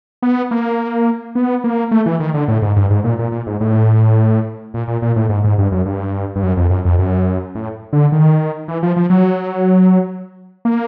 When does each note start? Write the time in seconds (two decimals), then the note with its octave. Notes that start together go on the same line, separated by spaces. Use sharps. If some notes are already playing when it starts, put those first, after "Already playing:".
0.22 B3
0.51 A#3
1.35 B3
1.64 A#3
1.91 A3
2.06 E3
2.20 D#3
2.34 D3
2.48 A2
2.62 G#2
2.76 G2
2.90 G#2
3.04 A#2
3.19 A#2
3.32 A#2
3.47 G#2
3.60 A2
4.74 A#2
4.88 A#2
5.02 A#2
5.16 A2
5.29 G#2
5.44 G#2
5.58 G2
5.72 F#2
5.86 G2
6.36 G2
6.43 F#2
6.57 F2
6.70 F#2
6.85 F2
6.99 F#2
7.55 A2
7.93 D3
8.12 D#3
8.68 E3
8.83 F3
8.96 F3
9.10 F#3
10.65 A#3